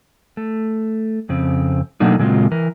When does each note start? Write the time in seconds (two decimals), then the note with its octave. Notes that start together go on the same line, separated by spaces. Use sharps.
0.37 A3
1.29 F2 C#3 C4
2.00 B2 F#3 A3 A#3 D4 D#4
2.19 A#2 C#3 F#3 G#3 C4 F4
2.52 E3 A#4